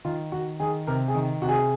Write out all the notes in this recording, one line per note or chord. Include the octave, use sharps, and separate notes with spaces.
D#3 F4
D#3 F#4
D#3 G#4
C3 A#4
G#4
D#3
C3 F#4
G#4